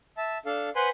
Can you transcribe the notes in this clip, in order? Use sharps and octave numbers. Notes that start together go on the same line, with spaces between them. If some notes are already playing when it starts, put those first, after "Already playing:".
E5 A5
D4 A4 F5
B4 C5 F#5 G#5 B5 C6